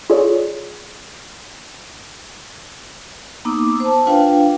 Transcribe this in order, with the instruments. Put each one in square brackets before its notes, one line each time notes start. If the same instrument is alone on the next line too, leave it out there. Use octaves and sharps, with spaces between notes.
[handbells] F4 G#4 A4 C#5 D5
[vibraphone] A#3 B3 D#4 D6 E6
C5 A5
D4 F4 B4 F5 G5